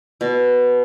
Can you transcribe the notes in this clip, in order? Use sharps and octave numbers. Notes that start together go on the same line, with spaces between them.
B2